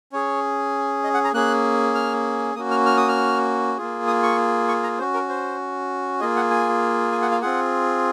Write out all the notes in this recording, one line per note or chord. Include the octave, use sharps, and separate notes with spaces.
C#4 G#4 C#5
D#5
F#5
A#5
A#3 C#4 G#4 F#6
F6
A#3 C#4 F#4 D#6
F6
F6
D#6
F6
A#3 F4 G#4
D#6
C#6
C#6
A#5
C#4 F#4 C5
A#4
C5
A#3 F4 G#4 D#5
F#5
G#5
G#5
F#5
F5
C4 F4 G#4 F#5